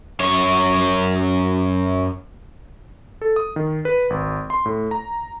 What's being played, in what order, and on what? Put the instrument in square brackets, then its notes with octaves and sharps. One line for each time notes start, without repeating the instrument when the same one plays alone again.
[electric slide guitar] F#2 C#5
[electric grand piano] A4
D#6
D#3
B4
G#1
C6
A2
A#5